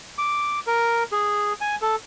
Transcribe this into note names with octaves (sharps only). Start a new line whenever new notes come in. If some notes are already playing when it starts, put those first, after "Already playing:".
D6
A#4
G#4
G#5
A4